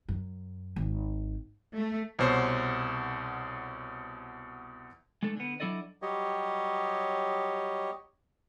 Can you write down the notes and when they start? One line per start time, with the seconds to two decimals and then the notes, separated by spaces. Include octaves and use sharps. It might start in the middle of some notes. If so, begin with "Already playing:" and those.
0.09 F#2
0.76 G#1
1.74 A3
2.19 C2 B2 C5 C#5 C7
5.23 G#3 A3 D4 A4
5.37 D3 B3
5.60 F#3 D4 E4 A4 D5 D#5
6.02 F#3 G3 G4 C#5 D#5